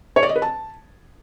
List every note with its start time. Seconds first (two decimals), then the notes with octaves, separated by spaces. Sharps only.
0.16 C#5
0.23 D5
0.29 D#5
0.36 B4
0.42 A5